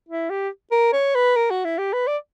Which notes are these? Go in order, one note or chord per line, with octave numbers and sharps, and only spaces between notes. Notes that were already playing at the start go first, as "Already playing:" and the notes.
E4
G4
A#4
C#5
B4
A#4
F#4
E4
G4
B4
D5